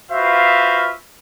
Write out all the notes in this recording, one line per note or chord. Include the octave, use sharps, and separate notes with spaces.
F4 F#4 B4 C5 E5 F5